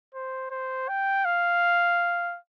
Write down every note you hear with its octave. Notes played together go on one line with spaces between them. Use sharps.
C5
C5
G5
F5